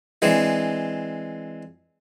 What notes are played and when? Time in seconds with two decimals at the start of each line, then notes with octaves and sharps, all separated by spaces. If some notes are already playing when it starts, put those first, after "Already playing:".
0.22 E3 G#3 C4 D4